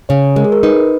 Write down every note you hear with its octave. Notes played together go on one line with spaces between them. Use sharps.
C#3 C#5
G#3 A#4
G#4
A#4
D#4 B4